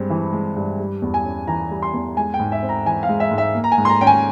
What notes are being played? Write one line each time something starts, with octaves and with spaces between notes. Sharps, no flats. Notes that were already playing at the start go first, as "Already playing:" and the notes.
Already playing: G2 G#3 C4
E3
G#3
G2
G3
E2
G#5
C#4
E3 A#5
G3
C6
E2
G#3 G#5
G5
G#2
E5
C4
A#5
E3 G#5
F5
G#3
E5
G#2
E5
A#3
A#5
G#5
G#2
C6
A#5
C#4 G5
G#5